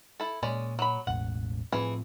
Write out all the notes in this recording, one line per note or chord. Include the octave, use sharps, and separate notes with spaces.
E4 A4
A#2 G#3 C#4 D5
F#3 B5
E1 A1 F#5
A2 E3 F3 C4 G#4